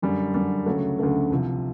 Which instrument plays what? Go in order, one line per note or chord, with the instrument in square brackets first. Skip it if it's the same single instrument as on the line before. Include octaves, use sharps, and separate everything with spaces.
[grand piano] F#2 D3 G3
F#2 D3 G3
D2 C#3 F#3 A3
D2 C#3 F#3 A3
C2 C3 F3